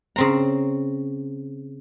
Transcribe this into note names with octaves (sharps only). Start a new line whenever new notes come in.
C#3 C4 A#5